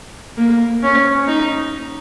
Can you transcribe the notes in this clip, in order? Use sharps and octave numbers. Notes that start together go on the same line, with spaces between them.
A#3
C#4
D#4